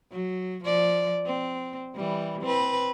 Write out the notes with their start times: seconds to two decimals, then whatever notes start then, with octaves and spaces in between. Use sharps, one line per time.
0.12 F#3
0.64 F3 D5
1.25 C4
1.95 E3 G3
2.42 C4 B4